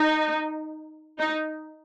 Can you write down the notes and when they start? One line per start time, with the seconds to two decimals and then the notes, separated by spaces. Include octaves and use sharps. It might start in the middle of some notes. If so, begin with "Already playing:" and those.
Already playing: D#4
1.19 D#4